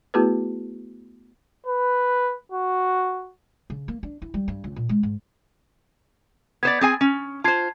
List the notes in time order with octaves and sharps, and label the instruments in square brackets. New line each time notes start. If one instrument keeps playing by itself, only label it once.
[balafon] A3 B3 E4 F#4 G#4 B4
[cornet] B4
F#4
[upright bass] C#3
A#3
D4
E4
G3
G2
C#2
A#2
G#3
G#2
[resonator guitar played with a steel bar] B3 C5 D5 [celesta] G#6 A6
[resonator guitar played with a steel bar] C4 G#4 G#5
C#4
[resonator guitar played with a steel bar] F4 C5 [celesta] A5 G#6 C7